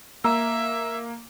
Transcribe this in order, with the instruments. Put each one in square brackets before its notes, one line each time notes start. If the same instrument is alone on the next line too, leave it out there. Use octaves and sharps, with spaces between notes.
[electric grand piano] A#3 [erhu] E5 [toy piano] A#5 E6